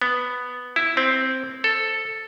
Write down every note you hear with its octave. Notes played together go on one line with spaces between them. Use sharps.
B3
E4
C4
A4